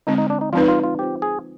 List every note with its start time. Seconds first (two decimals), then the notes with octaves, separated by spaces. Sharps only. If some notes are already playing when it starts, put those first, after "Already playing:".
0.07 D3 G#3 C4 D#4
0.18 D#4
0.30 D4
0.41 D#4
0.53 F3 G#3 C4 D#4 F4 B4
0.68 F4
0.83 F4
0.99 C4 F4 G4 C5
1.22 G#4